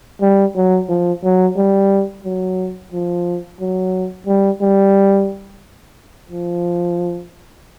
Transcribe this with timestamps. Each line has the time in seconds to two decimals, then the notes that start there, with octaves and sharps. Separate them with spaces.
0.22 G3
0.56 F#3
0.89 F3
1.24 F#3
1.57 G3
2.24 F#3
2.92 F3
3.60 F#3
4.27 G3
4.62 G3
6.30 F3